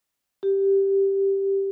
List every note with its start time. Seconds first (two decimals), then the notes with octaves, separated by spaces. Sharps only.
0.43 G4